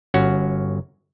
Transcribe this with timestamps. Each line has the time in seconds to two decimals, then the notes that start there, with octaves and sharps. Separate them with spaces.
0.14 G1 C#4 F#4 F#5